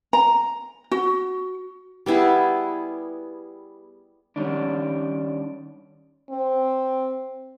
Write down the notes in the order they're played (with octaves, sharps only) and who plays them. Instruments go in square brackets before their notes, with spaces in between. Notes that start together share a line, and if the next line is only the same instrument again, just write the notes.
[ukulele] A#5
F#4
[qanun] G3 B3 E4 G#4
[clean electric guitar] D#3 G3 C#4 D4
[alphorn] C4